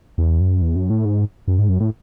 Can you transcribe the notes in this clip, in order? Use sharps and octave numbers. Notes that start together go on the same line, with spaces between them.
E2
F#2
E2
F#2
A2
G#2
F#2
G#2
F#2
A2